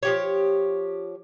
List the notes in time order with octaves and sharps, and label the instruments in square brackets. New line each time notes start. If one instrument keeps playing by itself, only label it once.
[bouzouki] F3 G4 C#5